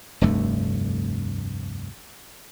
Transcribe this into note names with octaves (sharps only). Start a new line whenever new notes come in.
F1 D2 G2 A3